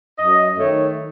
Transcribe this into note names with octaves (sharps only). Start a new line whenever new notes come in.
F#2 D#5
D#3 A3 C#5